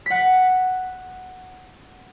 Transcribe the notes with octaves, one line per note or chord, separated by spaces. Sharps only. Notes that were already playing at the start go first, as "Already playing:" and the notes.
F#5 B6